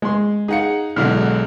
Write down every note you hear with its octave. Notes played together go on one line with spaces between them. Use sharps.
G#3 C6
D#4 G#4 F5 F#5 C#7
B1 B2 D3 G#3 E4 F6